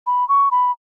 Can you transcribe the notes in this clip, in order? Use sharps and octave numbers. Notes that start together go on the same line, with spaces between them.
B5
C#6
B5